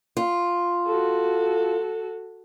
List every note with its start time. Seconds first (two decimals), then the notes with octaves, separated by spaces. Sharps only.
0.17 F4
0.86 F#4 A4